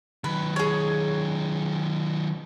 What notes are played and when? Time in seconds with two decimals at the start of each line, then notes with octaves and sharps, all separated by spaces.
0.24 D#3 F#3 B4
0.56 G#4 C#5